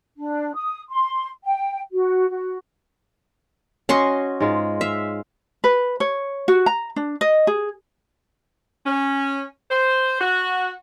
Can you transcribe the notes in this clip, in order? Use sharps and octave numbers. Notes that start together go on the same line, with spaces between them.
D4
D#6
C6
G5
F#4
F#4
C#4 F#4 D#5 C6 C#6
G#2 G#3 F4
E5 F5
B4
C#5
F#4
A#5
D4
D#5
G#4
C#4
C5
F#4